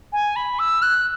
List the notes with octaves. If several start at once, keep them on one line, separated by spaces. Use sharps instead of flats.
G#5
B5
E6
F#6